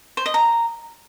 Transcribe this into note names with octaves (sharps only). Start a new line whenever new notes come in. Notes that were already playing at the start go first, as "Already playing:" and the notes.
C5
D#5
A#5